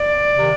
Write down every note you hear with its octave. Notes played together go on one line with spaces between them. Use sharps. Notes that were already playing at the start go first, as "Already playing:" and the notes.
Already playing: D5
C3 D#3